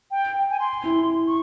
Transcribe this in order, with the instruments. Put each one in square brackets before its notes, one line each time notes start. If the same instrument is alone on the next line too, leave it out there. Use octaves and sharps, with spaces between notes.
[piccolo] G5
G#5
C6
[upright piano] E4
[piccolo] C#6